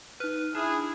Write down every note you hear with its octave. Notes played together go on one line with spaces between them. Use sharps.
D#4 B4 F6
D4 E4 G#4